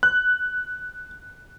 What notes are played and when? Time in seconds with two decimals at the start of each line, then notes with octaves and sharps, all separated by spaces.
0.03 F#6